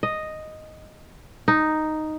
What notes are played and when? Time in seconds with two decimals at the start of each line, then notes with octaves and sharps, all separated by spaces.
0.03 D#5
1.48 D#4